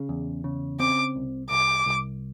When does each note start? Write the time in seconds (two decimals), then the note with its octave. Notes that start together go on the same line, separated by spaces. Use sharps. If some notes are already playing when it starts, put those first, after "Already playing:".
Already playing: C#3
0.09 E2
0.44 C#3
0.80 C4 D6
1.16 C2
1.50 C2 D6
1.86 C2